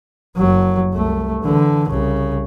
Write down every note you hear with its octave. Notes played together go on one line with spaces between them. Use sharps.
F#1 F#3
C2 A3
D3 E3
C2 C#3